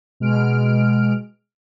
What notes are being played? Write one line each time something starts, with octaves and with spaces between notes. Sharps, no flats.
B2 G#3 F6 D7